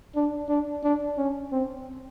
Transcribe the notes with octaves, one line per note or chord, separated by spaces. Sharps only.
D4
D4
D4
C#4
C4